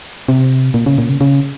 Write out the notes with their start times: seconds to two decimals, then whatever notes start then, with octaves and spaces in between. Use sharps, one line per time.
0.29 C3
0.74 A#2
0.86 C#3
0.98 A#2
1.09 C#3
1.21 C#3